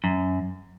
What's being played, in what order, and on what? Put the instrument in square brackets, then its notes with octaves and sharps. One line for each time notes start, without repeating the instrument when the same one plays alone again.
[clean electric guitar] F#2